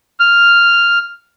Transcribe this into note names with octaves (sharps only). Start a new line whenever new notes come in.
F6